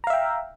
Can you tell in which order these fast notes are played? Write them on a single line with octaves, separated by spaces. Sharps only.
A#5 F5 E5 G5